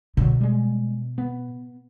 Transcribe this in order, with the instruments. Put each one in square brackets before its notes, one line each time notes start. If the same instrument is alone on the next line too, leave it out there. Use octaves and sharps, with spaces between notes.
[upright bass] B2 [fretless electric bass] D3 F#3
[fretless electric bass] G3 G#3
B3